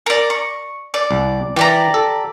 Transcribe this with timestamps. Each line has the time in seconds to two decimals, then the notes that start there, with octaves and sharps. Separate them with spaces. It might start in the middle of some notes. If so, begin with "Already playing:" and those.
0.06 A#4 D5
0.30 C#6
0.94 D5
1.11 C2
1.56 E3 G4 D5 A#5
1.94 A4